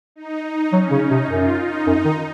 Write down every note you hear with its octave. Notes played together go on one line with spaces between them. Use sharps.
D#4
D#4
F#3 C#4
C#3
D#4
C3
F#2 F4
D#4
F#2 D#4
D#3